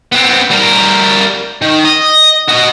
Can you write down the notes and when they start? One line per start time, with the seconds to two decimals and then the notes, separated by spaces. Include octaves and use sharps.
0.12 B3 C4
0.50 G3 A#4
1.61 D#3
1.85 D#5
2.49 F#4 D#5